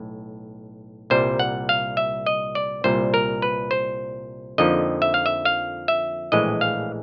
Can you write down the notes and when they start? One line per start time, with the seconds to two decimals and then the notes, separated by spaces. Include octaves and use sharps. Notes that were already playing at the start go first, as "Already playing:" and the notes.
Already playing: B1 A2
1.10 C2 A#2 G3 C5
1.39 F#5
1.69 F5
1.97 E5
2.26 D#5
2.55 D5
2.84 C2 A#2 G3 C5
3.14 A#4
3.42 B4
3.71 C5
4.58 F2 D3 F3 A#3 D#4 D#5
5.02 E5
5.14 F5
5.26 E5
5.45 F5
5.88 E5
6.32 A#1 A2 E3 G#3 D#5
6.61 F5